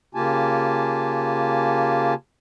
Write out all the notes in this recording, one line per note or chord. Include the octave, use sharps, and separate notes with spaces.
C#3 A#3 F4 G4 G#5 A5